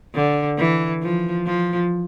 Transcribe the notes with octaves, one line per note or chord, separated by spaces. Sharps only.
D3
E3
F3
F3